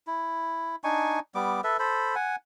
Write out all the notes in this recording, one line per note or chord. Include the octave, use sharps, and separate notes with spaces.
E4
D4 D#4 G#5 C#6
G3 B3 D6
A4 B4 E5
A4 C5 B5
F#5 G#5